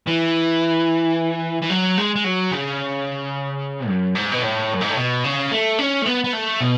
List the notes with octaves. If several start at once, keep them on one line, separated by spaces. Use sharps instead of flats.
E3
E3
F#3
G#3
G#3
F#3
C#3
F#2
G#2
B2
A2
F#2
G#2
A2
B2
C#3
A3
C#4
A3
B3
B3
A3
B2